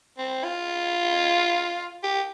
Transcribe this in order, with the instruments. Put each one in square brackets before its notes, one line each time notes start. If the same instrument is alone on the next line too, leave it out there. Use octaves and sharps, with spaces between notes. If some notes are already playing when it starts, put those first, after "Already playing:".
[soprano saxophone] C4
F4
G4